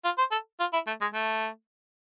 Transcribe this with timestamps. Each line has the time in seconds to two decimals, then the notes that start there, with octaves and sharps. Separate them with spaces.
0.05 F4
0.18 C5
0.31 A4
0.60 F4
0.73 E4
0.87 A3
1.01 G#3
1.14 A3